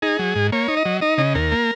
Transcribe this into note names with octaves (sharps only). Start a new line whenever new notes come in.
D#4 G#4
F#3
G#2
A#3 C#5
D#4
D#5
F#3
D#4 D#5
C#3 D#5
D#2 A#4
A#3